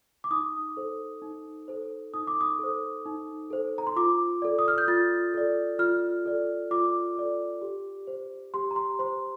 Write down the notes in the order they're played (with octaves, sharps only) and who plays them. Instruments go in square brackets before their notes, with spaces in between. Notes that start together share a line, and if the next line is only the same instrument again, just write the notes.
[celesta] D6
D#4 D#6
A4 C5
D#4
A4 C5
D#4 D#6
D6
D#6
A4 C5
D#4
A4 C5
A#5
C6
F4 D6
A4 D5
D#6
F6
G6
F4 A6
A4 D5
F4 F6
A4 D5
F4 D6
A4 D5
G4
C5
G4 C6
A#5
C6
C5 C6